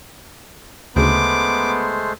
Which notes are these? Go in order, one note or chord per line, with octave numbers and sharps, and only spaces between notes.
D2 C#3 G#3 A3 B3 C5 D6